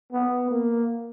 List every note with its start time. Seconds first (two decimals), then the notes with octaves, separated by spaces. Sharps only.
0.12 B3
0.51 A#3